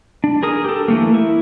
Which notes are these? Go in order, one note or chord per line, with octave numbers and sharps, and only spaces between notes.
D4
G#4 A#4 D#6
G4 A4
E3 A3 A#3
E4